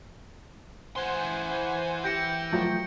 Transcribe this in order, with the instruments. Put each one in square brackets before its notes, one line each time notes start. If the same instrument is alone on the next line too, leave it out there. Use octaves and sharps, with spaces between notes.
[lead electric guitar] E3 C6 [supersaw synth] C5 F#5 G#5
[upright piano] G4 [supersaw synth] G5 [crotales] G6 A#6 C#7
[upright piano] F3 F#3 A3